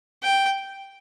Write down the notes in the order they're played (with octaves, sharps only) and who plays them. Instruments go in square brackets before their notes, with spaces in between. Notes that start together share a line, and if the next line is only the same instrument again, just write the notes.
[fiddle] G5